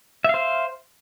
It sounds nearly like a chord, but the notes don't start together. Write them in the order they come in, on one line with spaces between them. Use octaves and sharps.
E5 F5 C5